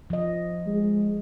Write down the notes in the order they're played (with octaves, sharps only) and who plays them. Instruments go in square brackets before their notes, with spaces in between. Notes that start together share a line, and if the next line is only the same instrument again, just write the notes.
[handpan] F3 D#5
[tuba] G#3